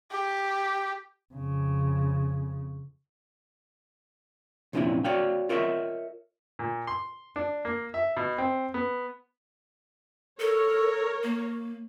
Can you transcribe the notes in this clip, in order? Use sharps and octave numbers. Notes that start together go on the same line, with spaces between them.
G4
F2 C#3
C2 F2 A#2 C#4 D4 E4
F#4 C#5 D5 F5 G5
F4 A#4 C#5 D#5 E5
A#2
C6
D4
A#3
E5
B2
C4
B3
A4 A#4 C#5
A#3